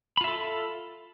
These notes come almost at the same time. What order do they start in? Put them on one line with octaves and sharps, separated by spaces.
B5 F4 E5 A4